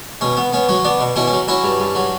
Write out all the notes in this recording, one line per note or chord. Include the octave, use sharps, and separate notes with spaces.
B2 C#4
B3
B3 C#4
F#3 C#4
B3 D4
B2
B2 C#4 E4
C#4
F#3
F#3 C#4 E4
G2
G2
F#3